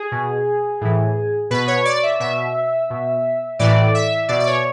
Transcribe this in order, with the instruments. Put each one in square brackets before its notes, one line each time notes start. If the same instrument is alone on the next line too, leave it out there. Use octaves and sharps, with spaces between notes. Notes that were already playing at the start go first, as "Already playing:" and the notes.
Already playing: [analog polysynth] G#4
B2
A2 E3
B2 B4
C#5
D5
E5
B2 E5
B2
A2 E3 D5
E5
B2 D5
D5
C#5